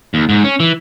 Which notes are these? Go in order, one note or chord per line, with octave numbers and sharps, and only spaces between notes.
D#2
G#2
C#4
E3